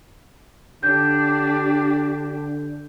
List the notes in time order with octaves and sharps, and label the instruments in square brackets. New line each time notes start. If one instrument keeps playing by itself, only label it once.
[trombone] D3 [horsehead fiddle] D4 G4 [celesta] G6